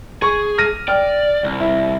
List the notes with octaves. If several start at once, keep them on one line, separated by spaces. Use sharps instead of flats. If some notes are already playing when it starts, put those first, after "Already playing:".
G#4 C#6
F6 A#6 D#7
D5 G5 F6
C2
E4